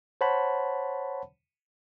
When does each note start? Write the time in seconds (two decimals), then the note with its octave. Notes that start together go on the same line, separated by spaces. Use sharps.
0.21 C5 C#5 F#5 A5 B5